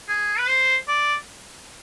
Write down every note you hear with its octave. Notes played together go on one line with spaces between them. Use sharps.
G#4
B4
C5
D5